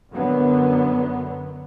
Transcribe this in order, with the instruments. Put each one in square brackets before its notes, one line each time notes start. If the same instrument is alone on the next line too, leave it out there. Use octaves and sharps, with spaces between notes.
[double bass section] F#2 D3 F#3 B3